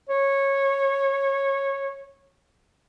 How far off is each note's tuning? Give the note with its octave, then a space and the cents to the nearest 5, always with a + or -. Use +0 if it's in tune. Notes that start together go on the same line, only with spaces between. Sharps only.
C#5 -15